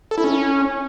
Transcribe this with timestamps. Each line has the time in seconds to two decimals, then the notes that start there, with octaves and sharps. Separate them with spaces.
0.11 A4
0.18 E4
0.24 C#4